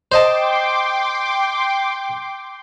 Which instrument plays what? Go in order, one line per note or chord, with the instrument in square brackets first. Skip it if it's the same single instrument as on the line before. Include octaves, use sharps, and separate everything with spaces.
[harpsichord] C5 D#5 A5 [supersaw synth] G5 C6 D6